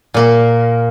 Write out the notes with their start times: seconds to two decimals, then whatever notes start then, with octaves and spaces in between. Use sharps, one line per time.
0.14 A#2 A#3 A#4